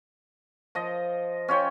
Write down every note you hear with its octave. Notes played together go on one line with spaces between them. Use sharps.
F3 D#5
C#4 F4 C#5 G5